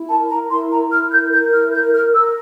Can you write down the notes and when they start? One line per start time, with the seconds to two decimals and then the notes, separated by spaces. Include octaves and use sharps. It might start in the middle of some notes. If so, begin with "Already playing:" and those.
Already playing: E4
0.09 A#4 A5
0.30 A#4 A#5
0.50 E4 C6
0.70 E4 A#5
0.91 E4 F6
1.11 A#4 G6
1.32 A#4 G6
1.52 E4 F6
1.72 A#4 G6
1.93 A#4 F6
2.13 A#4 E6